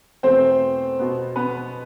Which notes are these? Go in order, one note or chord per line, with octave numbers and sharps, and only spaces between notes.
E2 B2 A3 C4 C5
B2 B3
B3 B4